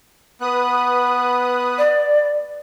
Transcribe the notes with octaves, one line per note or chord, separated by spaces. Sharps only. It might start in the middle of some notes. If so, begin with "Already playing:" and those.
B3 B4 D#6 F#6
D5